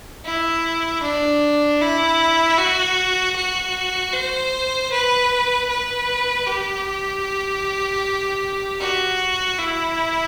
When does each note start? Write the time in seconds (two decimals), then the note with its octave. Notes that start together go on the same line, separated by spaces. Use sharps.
0.25 E4
1.03 D4
1.81 E4
2.58 F#4
3.36 F#4
4.13 C5
4.92 B4
5.69 B4
6.47 G4
8.79 F#4
9.58 E4